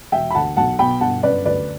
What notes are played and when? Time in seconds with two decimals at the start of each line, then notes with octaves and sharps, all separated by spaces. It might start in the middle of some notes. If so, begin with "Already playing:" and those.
0.12 E1 E5 G5
0.30 B5
0.35 D2 F#5 A5
0.57 B1 F#5 A5
0.79 B2 G5 B5
1.01 G1 F#5 A5
1.23 F#2 B4 D5
1.45 D2 B4 D5